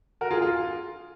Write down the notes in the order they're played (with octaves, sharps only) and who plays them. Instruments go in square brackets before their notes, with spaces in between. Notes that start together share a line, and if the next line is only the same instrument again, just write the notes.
[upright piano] F#4 A#4
F4 G#4
F4